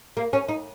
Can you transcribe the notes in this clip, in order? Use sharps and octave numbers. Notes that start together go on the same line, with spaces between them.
A#3
C#4
D#4